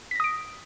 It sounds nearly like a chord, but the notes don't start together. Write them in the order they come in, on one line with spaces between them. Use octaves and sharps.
B6 A#6 D#6 D7